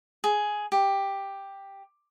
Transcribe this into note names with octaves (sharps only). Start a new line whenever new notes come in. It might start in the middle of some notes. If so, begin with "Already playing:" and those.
G#4
G4